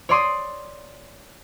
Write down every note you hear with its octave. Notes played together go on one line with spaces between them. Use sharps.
C#5 D5 C6 D#6